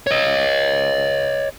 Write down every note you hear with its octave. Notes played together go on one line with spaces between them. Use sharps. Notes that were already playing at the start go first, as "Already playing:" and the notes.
C#5 D#5